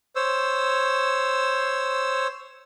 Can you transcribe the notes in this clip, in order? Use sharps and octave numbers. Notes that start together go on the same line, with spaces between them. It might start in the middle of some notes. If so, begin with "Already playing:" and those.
C5 C#5 E6